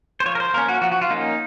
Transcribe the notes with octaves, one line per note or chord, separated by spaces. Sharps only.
C5
F3 C#5
A#4
C5
A#3 C#4 A#4
F#4
F3 F#4
F#4
F4
A#3 C#4 D#4